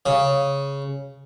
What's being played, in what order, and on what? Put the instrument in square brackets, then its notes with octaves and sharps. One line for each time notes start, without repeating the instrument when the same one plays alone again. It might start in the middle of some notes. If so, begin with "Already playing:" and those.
[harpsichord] C#3